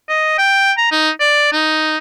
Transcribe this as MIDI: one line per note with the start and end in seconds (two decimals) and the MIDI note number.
0.09 0.37 75
0.38 0.72 79
0.77 0.87 82
0.91 1.10 63
1.20 1.48 74
1.52 1.97 63